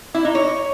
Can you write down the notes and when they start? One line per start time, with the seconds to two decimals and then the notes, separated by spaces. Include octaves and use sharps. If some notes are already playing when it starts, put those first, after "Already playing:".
0.14 E4
0.25 D#4
0.35 C#5